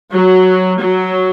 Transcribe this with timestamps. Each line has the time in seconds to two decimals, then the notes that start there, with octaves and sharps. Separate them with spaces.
0.12 F#3
0.79 F#3